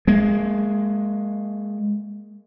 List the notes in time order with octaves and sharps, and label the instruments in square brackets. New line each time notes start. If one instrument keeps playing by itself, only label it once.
[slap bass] G#3 A#3